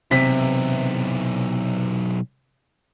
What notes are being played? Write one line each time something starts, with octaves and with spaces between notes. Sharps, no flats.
B1 C3 E3 B6